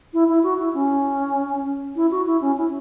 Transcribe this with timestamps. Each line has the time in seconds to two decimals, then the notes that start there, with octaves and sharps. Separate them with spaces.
0.14 E4
0.28 E4
0.43 F#4
0.59 E4
0.74 C#4
1.96 E4
2.11 F#4
2.27 E4
2.41 C#4
2.57 E4